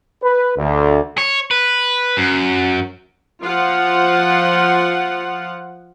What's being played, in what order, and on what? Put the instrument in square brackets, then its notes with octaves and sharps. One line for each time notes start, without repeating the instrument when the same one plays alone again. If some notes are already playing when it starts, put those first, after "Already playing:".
[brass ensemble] B4
D2
[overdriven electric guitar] C#5
B4
F#2
[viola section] F3 F4 F#5